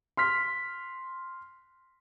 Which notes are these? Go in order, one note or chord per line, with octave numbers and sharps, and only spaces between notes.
C6 F6 B6